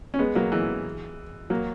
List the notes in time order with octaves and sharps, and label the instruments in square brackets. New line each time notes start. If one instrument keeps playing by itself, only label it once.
[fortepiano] C#4
G#3 B3
F#3 A#3
E3 G#3
F#3 A#3